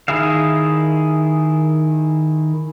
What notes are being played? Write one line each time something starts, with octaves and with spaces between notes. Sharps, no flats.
D#3 E4 G#4 E5 F5